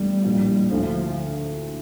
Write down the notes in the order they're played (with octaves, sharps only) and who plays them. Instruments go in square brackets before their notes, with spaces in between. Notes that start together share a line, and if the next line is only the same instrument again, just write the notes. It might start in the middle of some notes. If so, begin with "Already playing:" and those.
Already playing: [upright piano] E2 E3 A3 D4 G4 [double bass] G3
[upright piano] A#1 A2 F3 A#3
[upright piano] D2 D3 A3 E4 [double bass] F3